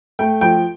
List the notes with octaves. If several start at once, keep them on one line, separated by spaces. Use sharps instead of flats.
A3 G5
F3 G5